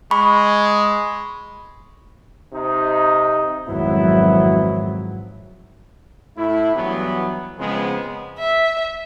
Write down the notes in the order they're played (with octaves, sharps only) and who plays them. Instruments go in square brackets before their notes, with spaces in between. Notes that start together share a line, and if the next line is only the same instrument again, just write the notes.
[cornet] G#3 [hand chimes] B5 C#6
[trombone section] C3 D#4
[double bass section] G#1 F2 F#3 [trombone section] B3 E4
[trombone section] A2 E4
G2 E3 F#3 B3
C#3 F3 G#3 B3 C4
[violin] E5